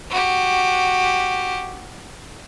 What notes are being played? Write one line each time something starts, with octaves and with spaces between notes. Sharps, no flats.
F#4 G4